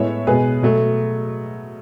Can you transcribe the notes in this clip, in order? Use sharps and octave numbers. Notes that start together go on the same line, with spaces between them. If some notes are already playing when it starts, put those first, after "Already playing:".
Already playing: A2 G#3 B3 C#5 E5
B2 G#3 B3 G#4 B4
B2 F#3 A3